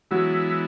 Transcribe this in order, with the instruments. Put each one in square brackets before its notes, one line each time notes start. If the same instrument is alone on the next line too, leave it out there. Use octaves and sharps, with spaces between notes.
[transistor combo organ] E3 G#3 B3 E4 [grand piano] F#3 F#4